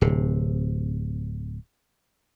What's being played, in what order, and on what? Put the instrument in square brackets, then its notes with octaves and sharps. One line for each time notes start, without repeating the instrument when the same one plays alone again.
[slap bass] D1 C3